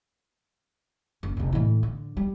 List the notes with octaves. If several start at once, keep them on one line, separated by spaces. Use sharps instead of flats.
F#1
F1 D3
A2 E3
D3
G3